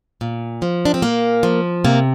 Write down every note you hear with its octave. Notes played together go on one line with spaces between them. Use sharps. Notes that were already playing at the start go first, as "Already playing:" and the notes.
A#2
F3
D4
C4
A#2 A#3
F3
C3 A#3